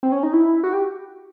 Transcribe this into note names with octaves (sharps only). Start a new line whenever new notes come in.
C4
C#4
D#4
E4
F#4
G4